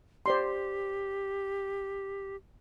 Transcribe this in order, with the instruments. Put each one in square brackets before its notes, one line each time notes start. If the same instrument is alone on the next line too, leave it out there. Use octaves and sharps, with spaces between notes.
[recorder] G4 [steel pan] C5 D5 C6